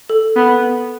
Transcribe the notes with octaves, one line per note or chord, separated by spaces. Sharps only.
A4
B3